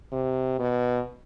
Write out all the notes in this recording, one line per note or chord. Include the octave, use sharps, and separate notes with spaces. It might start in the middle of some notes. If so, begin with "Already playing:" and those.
C3
B2